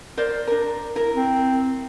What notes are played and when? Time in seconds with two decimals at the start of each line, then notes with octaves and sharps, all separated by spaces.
0.17 A#4 C5 D5
0.47 D4 A#4
0.95 E4 A#4
1.14 C4